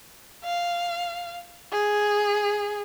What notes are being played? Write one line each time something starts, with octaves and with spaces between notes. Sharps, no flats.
F5
G#4